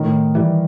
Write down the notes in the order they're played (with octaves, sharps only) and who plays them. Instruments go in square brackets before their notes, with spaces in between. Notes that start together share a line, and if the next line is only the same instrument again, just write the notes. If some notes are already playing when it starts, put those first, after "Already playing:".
Already playing: [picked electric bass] A2 [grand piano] D#3
[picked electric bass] E3 G3